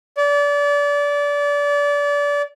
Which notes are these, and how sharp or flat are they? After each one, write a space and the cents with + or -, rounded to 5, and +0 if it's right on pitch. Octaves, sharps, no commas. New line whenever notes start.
D5 -30